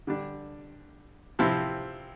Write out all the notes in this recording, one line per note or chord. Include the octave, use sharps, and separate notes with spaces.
D3 G3 D4
C3 F3 C4 E4